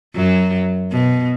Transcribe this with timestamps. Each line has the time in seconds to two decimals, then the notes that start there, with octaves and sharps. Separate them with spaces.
0.16 F#2 F#3
0.92 B2